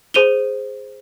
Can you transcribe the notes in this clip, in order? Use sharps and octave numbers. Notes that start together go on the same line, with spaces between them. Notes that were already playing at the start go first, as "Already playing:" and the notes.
G#4 C5 D#7 F7 G7